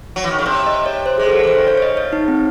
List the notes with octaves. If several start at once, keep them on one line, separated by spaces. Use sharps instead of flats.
F#3
E3
D#3
C#3
C3 C#5
D#5
C#5
C5
G#3 G#4
A4
F#3
A4
E3 C5
D#3
C#3 C#5
C#5
D#5
C#5
D#4
C4